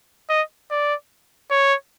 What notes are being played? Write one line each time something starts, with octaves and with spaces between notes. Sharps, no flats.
D#5
D5
C#5